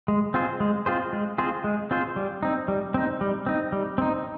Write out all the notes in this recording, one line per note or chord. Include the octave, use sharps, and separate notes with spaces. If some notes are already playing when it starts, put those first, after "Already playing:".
G#3
C4 F4 G#4 C5
G#3
C4 F4 G#4 C5
G#3
C4 F4 G#4 C5
G#3
C4 F4 G#4 C5
G3
C4 D#4
G3
C4 D#4
G3
C4 D#4
G3
C4 D#4